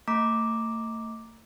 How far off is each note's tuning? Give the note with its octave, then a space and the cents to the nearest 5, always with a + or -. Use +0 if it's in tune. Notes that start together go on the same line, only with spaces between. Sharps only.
A3 +40 A#5 +0 D6 +0